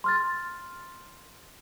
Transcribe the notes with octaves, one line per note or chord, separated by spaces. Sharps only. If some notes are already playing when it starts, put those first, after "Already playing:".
C6 F6 A6